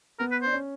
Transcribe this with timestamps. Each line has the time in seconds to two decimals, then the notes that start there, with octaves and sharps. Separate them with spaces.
0.19 B3 A#4
0.31 B4
0.42 D4 C5
0.53 C#4